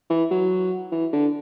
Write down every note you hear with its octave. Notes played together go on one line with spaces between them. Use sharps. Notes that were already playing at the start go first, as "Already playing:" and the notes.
E3
F#3
E3
D3